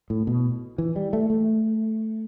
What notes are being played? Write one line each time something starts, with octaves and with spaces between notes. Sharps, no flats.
A2
B2
E3
G3
A3
A3